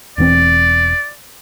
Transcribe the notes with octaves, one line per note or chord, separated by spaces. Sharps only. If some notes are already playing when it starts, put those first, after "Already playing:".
E1 E3 C4 D5